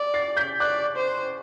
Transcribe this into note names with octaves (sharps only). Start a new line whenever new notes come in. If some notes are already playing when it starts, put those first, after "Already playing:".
Already playing: D5
A6 C7
G6 B6
D5 D6 F#6
C5